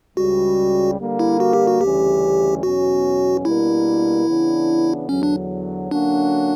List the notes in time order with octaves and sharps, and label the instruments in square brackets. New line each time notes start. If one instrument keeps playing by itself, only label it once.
[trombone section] C#2 C#3 G3 [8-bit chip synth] F#4
[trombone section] D3 G3 A#3
[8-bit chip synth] E4
F#4
G4
F#4
[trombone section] D2 C#3 E3 G3 C#4 [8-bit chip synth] G4
[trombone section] E2 B2 F#3 C#4 [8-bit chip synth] F#4
[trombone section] B2 G3 A#3 D4 A#4 [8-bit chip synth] E4
[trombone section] C#3 E3 B3 D4
[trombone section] E2 D3 F#3 [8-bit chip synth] C#4
[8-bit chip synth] D4
[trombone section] D3 F#3 A#3 C#4 F#4 [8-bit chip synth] D4